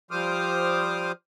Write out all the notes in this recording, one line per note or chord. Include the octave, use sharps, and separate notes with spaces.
F3 G3 C5 D6 D#6 F6